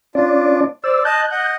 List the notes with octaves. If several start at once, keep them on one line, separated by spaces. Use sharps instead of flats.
C#4 D4 F4 D5
C5 D5 E6
D#5 A5 F#6 G6
D#5 F#5